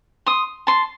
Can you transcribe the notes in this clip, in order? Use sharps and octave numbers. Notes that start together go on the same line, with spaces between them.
C6 D#6
A5 C6